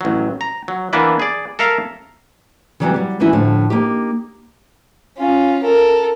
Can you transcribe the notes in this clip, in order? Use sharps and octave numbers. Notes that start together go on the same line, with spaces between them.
A1 F#3
A#5
F#3
E3 A#3 B3 D4 E4 B4
G#4 D5
A4 A#4 E5 F5 A#5
C#3 E3 F#3 G3 B3 C4
F#3 G3
E3 F3 C#4 D#4 E4 F#4
A2 D3 F3
A#3 D#4 G4
C#4 F4
A4 A#4